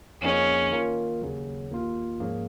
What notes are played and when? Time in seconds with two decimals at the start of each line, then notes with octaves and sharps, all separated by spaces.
0.21 F2 F3 A#3 C#4 D#4 G#4
0.72 D#3 A#3 F4 A#4
1.21 D#2 C#3 F#3
1.71 D#2 D#3 A#3 F4
2.19 G#2 F3 A#3 C#4 G#4